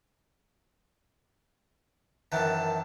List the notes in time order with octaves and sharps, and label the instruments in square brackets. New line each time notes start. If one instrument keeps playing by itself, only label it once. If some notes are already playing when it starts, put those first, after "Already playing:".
[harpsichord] F#2 D#3 E3 [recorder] A5